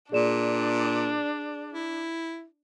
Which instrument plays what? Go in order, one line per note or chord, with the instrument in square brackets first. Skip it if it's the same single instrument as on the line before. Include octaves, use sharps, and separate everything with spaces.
[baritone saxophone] A#2 [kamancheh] D4 [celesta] G#4 D5 E7
[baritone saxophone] E4